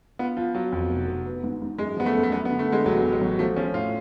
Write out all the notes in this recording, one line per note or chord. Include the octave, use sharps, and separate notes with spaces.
B3 F4
F3 F4
F#3 F4
F2
F1
F1
B3
G#2
G#2
F#2 G#3
F3 B3
A3
F#2
A3
F#2 B3
B3
D3
A3
D3 G#3
A1 F#3
A1
G#3
F#3
F3 A3
F3 C#4
A2 F4